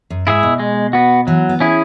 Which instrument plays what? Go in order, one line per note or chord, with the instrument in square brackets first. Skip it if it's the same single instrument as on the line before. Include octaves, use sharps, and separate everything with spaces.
[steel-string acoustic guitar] F#2
[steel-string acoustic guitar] G#2 [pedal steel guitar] E4 G#4 E5
[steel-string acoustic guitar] B2
[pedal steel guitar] G#3
B3 F#4
[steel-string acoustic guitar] E3 [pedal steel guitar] F#3
[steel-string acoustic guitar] B3
[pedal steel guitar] C#4 E4 G#4